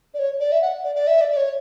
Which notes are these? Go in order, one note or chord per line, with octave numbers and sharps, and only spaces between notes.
D5
C#5
D5
E5
F#5
D5
D5
E5
D5
D5
C#5